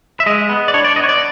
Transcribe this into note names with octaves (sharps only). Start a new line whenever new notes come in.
E5
G#3 D#5
B3
D5
D4 C#5
D5
B3 D#5
C#5
D5